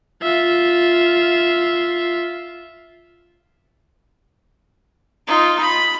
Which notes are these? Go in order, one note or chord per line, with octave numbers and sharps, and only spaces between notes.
F4 E5
D#4 F4
B5